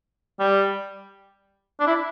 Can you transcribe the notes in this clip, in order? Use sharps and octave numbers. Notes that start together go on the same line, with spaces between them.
G3
D4
E4